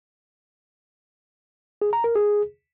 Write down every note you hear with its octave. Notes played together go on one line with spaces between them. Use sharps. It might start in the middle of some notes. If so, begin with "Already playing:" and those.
G#4
A#5
A#4
G#4